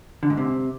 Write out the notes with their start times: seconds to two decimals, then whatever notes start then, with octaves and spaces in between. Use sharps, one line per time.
0.23 D3
0.30 G#2
0.37 C3